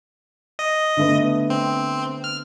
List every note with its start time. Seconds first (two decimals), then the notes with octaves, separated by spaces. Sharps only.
0.59 D#5
0.97 D3 A3 B3
1.50 C4
2.24 F6